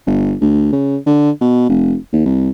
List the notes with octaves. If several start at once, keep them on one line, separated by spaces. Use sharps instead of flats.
G1
D2
C#3
D3
B2
F1
D#2
C2